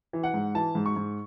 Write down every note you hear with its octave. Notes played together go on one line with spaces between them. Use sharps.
E3
F#5
G#2
E3 A5
G#2
C#6
G#2